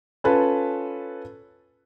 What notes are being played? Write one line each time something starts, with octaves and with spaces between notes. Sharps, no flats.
C#4 F4 A4 B4